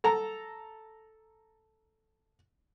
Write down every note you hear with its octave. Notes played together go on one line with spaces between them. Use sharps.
A4 A#5